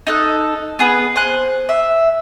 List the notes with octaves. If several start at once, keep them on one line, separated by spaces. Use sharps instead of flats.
D#4 A4 F#6
B3 G#4 B4
C5 G#5 F#6
E5